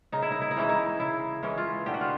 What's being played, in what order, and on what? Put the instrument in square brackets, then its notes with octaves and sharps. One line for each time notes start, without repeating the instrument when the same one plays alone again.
[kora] C#3 D#4
E4
D#4
E4
D#4
E3 G#3 C#4 E4
D#4
C#3 E4
E3 G#3 C#4
F4
D3 G4
F#4
F4